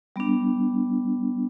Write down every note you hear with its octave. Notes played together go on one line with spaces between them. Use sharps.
G3 B3 D4